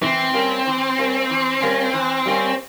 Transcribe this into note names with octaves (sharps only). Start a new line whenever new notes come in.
E3 C4
G3 A#3 C#4
E3
G3 A#3 C#4
E3
G3 A#3 C#4
E3
G3 A#3 C#4